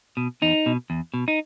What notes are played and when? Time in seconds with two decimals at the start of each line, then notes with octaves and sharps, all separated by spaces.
0.17 B2
0.42 E2 D#4
0.66 B2
0.90 E2
1.14 B2
1.28 D#4